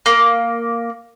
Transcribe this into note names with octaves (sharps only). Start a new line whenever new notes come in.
A#3